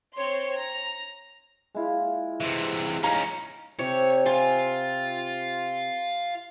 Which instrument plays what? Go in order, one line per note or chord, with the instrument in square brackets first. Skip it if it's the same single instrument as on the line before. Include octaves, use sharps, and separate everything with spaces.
[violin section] C4 C#5 C6
A#5
[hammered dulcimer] G#3 E4 F4
[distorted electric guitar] C3 E3
[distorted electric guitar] C#4 D#4 [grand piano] F5 A#5
[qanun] C3 G4 [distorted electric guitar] C#5
[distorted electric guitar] F4 [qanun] G#5